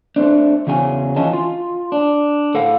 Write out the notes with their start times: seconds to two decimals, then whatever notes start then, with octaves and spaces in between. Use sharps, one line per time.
0.16 A3 C4 D4
0.67 E2 C#3 F#3 G#4 G#5
1.16 E3 C#4 F4 D#5 G#5 A5
1.33 F4
1.92 D4
2.55 A2 A4 F5 F#5